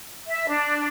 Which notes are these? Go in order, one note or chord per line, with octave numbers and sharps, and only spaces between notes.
E5
D4